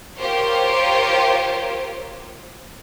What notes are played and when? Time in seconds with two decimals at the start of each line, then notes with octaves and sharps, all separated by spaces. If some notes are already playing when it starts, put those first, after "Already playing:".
0.20 F4 G4 A#4 C5 C#5 F5